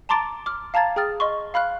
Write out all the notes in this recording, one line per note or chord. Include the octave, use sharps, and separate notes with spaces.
A5 A#5 C6 D6 A6 D7
D6 F6
F5 A5 A#5 G#6 A6
G#4 G5 D#6 F6 A6
D#5 C6 C#6
F5 B5 F6 F#6